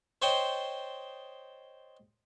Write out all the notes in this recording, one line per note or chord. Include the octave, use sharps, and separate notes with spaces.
C5 C#5 D#5 G5 A5 C6